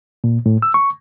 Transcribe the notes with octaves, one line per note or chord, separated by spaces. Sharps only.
A#2
A2
E6
C#6